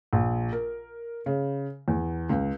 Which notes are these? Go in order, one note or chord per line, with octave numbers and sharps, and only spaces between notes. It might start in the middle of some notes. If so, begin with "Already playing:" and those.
A#1
A#4
C#3
E2
C#2